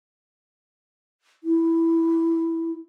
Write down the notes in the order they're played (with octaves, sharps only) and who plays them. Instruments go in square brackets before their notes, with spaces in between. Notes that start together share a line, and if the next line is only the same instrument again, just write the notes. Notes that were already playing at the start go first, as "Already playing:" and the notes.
[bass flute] E4